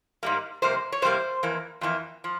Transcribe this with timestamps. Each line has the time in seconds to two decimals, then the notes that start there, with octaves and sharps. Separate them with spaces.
0.23 G#2 G3 A#3
0.62 F2 C3 G3 A#3 C5
0.92 C#5
1.02 F2 C3 G3 A#3 C5
1.43 F2 E3 A#3
1.81 F2 E3 A#3
2.24 F3